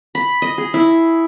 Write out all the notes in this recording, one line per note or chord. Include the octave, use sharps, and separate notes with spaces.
B5
D#5
G#4
E4